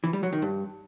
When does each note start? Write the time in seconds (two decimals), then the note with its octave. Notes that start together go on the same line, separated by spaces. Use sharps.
0.04 E3
0.13 G3
0.23 F#3
0.33 D#3
0.42 G2